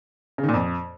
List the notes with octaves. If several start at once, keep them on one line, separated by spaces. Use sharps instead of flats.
C#3
D#3
A#2
F2